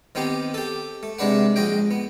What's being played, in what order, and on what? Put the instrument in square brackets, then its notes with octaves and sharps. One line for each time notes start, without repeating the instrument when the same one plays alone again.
[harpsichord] D#3 B3 C4 D#4 G4
G4 A4
A3
C3 G#3 D4 B4 F#5
A#1 G#3 F#4 D#5 G5
B3